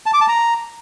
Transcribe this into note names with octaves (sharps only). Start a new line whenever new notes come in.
A5
D6
A5
A#5